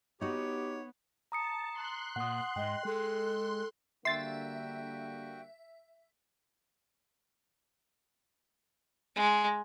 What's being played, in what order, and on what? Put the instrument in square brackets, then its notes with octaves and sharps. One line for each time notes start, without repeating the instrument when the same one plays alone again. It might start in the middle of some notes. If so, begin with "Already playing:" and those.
[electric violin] B3 [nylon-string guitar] D#4 F#4 [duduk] G4 [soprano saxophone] C#5
[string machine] A5 [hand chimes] A#5 D#6 C#7
[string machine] C6 F#6
[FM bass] A#2 [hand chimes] F#5 D#6
[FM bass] G#2 [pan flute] D#5 [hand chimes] G5
[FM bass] G#3 [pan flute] A4
[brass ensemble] D3 G3 A#3 [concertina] F#4 G5 [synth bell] E5 [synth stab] C6 A6
[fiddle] G#3